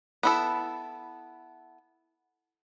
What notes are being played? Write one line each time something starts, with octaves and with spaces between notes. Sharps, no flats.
B3 E4 A4